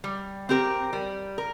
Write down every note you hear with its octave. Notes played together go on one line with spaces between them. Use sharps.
G3
C4 G4 A#4
G3
A#4